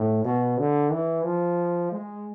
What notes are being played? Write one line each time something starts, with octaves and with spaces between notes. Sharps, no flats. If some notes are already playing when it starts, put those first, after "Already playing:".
Already playing: A2
B2
D3
E3
F3
G#3